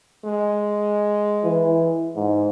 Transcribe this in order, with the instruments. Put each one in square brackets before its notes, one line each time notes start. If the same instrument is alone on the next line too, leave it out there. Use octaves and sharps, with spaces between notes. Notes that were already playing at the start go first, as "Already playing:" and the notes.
[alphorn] G#3
[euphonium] E3
G#2